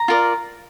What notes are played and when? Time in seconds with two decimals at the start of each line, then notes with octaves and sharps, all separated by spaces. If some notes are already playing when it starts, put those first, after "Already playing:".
Already playing: A#5
0.08 F4 A#4 D5